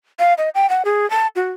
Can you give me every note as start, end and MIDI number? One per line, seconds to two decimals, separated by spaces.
0.19 0.34 77
0.38 0.49 75
0.55 0.69 79
0.70 0.82 78
0.85 1.08 68
1.10 1.27 81
1.36 1.52 66